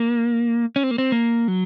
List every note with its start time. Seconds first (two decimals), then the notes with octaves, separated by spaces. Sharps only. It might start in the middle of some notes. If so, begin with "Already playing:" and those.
Already playing: A#3
0.76 C#4
0.83 C4
0.91 A#3
0.98 C4
1.12 A#3
1.48 F#3